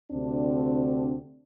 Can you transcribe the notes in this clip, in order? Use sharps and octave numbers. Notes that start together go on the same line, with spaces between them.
D2 C3 C4 D4